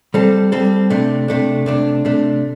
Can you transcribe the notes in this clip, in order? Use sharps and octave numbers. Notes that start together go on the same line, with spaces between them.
G3 C4 A4
G3 C4 A4
C3 A3 D4
C3 A3 D4
C3 A3 D4
C3 A3 D4